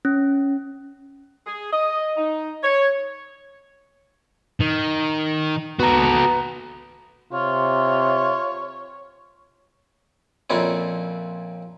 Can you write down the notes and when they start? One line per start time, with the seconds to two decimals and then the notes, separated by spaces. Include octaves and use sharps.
0.05 C#4
1.47 G#4
1.73 D#5
2.17 D#4
2.63 C#5
4.61 D#3
5.80 B3 F#4 A4 A#5
7.33 C3 F4 C#5
10.50 F2 A#2 C4 C#4 E4